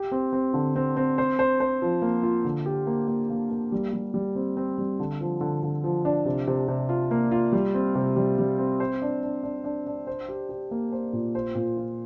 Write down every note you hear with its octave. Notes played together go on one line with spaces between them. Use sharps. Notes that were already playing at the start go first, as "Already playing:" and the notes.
Already playing: G4
C4
C4
D3
C4
C4
C5
C5
C5
F3
A#3
F4
D3
G4
A#3
A#3
A#3
A#3
G3
G3
G3
C4
C4
G3
D3
F3
D3
D3
F3
D4
C3
C3
C3
F4
A#3
F4
G3
C4
C3
G3
G3
C4
C5
D4
D4
D4
D4
D4
C5
G4
G4
A#3
C5
A#2
C5
A#2
F4